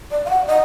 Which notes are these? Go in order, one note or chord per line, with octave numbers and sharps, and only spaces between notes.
D5
F5
F#5
D#5